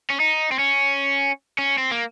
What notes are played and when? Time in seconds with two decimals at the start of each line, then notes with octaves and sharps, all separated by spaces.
0.10 C#4
0.20 D#4
0.51 C4
0.59 C#4
1.59 C#4
1.78 C4
1.91 A#3